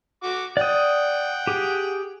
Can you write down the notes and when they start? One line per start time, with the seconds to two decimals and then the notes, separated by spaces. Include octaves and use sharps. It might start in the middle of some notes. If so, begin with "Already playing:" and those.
0.23 F#4 D6
0.57 D5 F#5 G5 D#6
1.47 G4 G#4